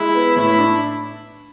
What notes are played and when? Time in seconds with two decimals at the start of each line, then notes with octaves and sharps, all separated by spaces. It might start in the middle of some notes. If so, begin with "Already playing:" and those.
Already playing: G#3 E4
0.15 B3
0.36 A2 E4
0.58 D4